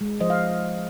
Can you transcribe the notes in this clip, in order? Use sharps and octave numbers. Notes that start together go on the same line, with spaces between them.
G#3
F3 C5 D#5
F5